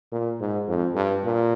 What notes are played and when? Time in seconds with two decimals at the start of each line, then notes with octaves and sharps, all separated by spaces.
0.12 A#2
0.40 G#2
0.68 F2
0.95 G2
1.24 A#2